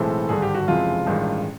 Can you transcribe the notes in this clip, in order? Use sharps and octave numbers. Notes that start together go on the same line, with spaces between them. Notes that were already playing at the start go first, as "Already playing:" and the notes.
Already playing: B1 A2 E3 G#3 C4 A4
G#1 G2 D3 G#4
G4
F#4
F#1 F2 C3 E3 G#3 F4
A1 G2 D#3 G#3